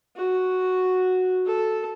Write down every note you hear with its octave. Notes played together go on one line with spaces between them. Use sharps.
F#4
A4